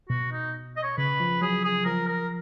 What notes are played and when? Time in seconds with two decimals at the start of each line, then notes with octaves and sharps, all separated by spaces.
0.09 B2 F#4
0.32 D#4
0.76 D#5
0.83 C#5
0.98 C#3 B4
1.20 F3
1.41 F#3 G#4
1.64 G#4
1.85 F3 A#4
2.07 A#4